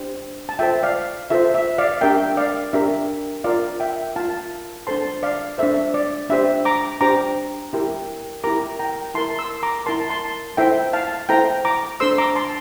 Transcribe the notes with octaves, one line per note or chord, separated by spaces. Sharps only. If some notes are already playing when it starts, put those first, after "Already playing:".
Already playing: D4 G4 C5
A5
F4 A4 C5 E5 G5
D5 F5
F4 A4 C5 E5
E5
D5 F5
D4 G4 A#4 E5 G5
D5 F5
D4 G4 A#4 E5
F4 A#4 D5 F5
E5 G5
F4 A#4 F5 A5
D4 A4 C5 A5 C6
D5 F5
D4 A4 C5 E5
D5
D4 G4 C5 E5
A#5 D6
D4 G4 C5 A#5 D6
E4 G4 A#4
E4 G4 A#4 A#5 D6
G5 A#5
E4 A#4 A5 C6
C6 E6
A#5 D6
E4 A#4 A5 C6
A5 C6
E4 A4 C5 E5 G5
F5 A5
E4 A4 C5 G5 A#5
A#5 D6
D4 A4 C5 C6 E6
A#5 D6
A5 C6